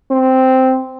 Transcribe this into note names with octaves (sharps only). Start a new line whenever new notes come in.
C4